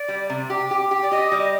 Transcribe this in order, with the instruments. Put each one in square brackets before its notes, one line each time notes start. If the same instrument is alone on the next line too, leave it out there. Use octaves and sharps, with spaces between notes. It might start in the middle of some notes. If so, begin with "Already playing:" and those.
Already playing: [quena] D5
[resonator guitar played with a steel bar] G3
C3
G4
G4
G4
[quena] D5
[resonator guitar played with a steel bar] G4 [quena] D#5
[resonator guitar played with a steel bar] G3